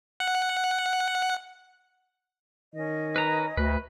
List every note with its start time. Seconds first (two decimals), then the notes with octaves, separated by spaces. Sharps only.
0.20 F#5
2.74 D#3 C#4 D#5
3.16 B4 A#5
3.57 D2 B4